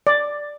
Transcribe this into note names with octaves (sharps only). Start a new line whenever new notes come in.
D5